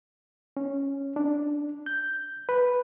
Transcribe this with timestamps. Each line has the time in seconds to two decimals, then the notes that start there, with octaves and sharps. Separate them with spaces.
0.57 C#4
1.16 D4
1.86 G6
2.49 B4